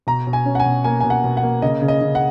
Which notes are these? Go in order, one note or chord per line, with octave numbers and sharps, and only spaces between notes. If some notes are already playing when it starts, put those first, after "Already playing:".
B2 A#5
B2
G#5
C#4
F#5
G#5
B2
A#3 G#5
B2 G#5
F#5
B2
F#5
A#3
C#3 D#5
C#3
D#5
C#3
F#5